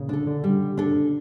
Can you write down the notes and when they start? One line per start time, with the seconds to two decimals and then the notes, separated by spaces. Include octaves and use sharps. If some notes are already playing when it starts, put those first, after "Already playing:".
Already playing: A#2 C#3
0.09 D3 D4 A4
0.27 D3
0.44 G3
0.77 D4 A4